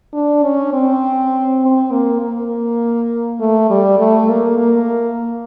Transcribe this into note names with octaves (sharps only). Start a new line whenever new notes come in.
D4
C#4
C4
C4
A#3
A#3
A3
G3
A3
A#3
A#3